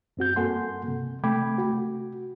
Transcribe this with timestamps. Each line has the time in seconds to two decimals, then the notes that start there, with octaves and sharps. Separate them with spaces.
0.17 F#2 C4 F#4 G6
0.36 G2 A#3 A4 F#5 G#5 C6
0.88 C3
1.24 C3 A3 G5 B5 D6 G#6
1.58 F#4